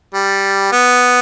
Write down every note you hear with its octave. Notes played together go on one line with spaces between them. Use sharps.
G3
B3